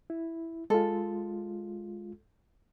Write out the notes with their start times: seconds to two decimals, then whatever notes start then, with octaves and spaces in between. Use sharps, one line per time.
0.10 E4
0.70 G#3 F4 A4